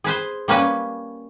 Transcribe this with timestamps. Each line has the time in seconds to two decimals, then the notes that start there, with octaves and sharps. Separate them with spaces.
0.04 G#4 B4 C5
0.48 G3 A#3 C#4 B4